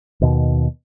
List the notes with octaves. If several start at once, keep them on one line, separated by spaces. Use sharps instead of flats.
D#2 B2